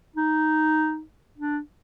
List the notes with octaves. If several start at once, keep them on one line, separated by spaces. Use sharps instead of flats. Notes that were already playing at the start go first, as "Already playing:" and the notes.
D#4
D4